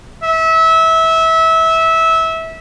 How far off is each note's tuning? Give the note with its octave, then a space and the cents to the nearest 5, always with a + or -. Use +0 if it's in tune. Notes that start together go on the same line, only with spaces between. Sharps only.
E5 -20